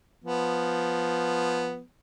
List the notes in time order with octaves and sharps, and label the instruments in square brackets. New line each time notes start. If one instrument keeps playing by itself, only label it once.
[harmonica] F3 B3